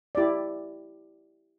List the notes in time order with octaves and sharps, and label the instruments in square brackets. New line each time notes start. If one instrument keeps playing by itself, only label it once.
[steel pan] E4 G4 D5